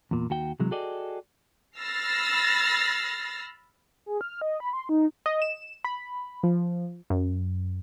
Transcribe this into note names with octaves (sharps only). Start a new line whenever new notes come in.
E2 A#2
D#2 F#4 G5
C3 E3 F#3 G#3
F#4 G#4 A4 D5 D#5 G5
B5 E6 F6 A6 A#6 C7
G#4
F6
D#5
B5
C6
D#4
D#5
E7
B5
F3
F#2